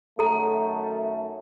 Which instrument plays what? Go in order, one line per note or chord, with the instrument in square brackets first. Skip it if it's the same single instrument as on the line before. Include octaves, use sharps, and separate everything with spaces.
[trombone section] F#2 D#3 A3 [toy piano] A4 A#5